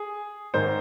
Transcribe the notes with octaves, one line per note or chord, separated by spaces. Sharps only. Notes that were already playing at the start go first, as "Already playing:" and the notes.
Already playing: G#4
G#2 D#3 C5